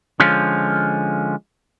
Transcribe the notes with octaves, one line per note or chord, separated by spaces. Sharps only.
D3 F3 G#3 C#4 F4